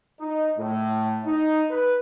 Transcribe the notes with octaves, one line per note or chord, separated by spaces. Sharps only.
D#4
A2
D#4
B4